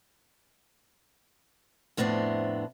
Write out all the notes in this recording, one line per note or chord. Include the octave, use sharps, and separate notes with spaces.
F2 A2 B3 C4 D4